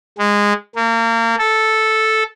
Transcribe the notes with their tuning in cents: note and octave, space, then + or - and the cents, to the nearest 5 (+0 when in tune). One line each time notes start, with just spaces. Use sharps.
G#3 -15
A#3 -30
A4 -5